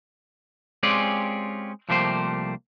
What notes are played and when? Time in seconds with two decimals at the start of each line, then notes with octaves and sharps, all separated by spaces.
0.83 G#3 C4 C#4 F4 G4 D5
1.89 C2 F3 A3 A#3 G4 C5